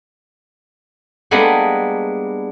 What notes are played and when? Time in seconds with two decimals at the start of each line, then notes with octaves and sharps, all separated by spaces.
1.31 G3 G#3 A#3 B3 D4 G#4